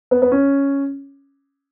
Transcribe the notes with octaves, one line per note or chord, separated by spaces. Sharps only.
B3
B3
C#4